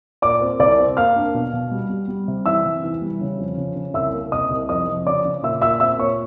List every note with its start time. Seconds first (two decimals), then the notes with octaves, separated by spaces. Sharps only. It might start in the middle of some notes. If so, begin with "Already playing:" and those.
0.22 A#2 D5 D6
0.41 C4
0.60 C2 D5 D6
0.79 C4
0.97 A#3 F5 F6
1.16 D4
1.34 B2
1.53 B2
1.71 G3
1.90 G3
2.08 G3
2.28 C3
2.46 E3 E5 E6
2.65 C3
2.84 E3
3.02 G3
3.21 C#3
3.39 F2
3.57 C#3
3.76 C#3
3.94 C2 E5 E6
4.13 A#3
4.32 C3 D#5 D#6
4.51 C2
4.69 F2 D#5 D#6
4.87 F2
5.06 C#3 D5 D6
5.25 C#3
5.43 A#2 E5 E6
5.61 A#2 E5 E6
5.80 C4 E5 E6
5.99 A#2 C#5 C#6